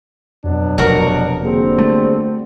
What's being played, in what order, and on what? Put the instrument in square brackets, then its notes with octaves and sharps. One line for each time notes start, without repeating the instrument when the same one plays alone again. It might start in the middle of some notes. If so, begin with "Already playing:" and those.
[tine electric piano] F2 [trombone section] B2 F#3 D4
[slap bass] F1 [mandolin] F#4 A#4
[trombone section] D3 G3 C4 [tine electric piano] A#3 G#4
[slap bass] A3